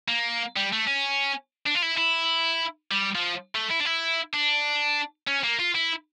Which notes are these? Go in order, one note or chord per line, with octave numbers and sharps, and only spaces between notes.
A#3
G3
A3
C#4
D4
F4
E4
E4
G3
F3
A3
E4
D4
E4
D4
C#4
A#3
F4
E4